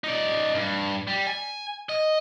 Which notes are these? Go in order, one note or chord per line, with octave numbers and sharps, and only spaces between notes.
D#4 D5
G2
G3
G#5
D#5